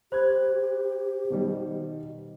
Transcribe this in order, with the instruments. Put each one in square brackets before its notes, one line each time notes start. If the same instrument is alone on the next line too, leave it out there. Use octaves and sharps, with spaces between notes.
[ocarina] G4 [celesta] C5 [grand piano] B5 F#6 G#6
[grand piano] B2 D#3 G3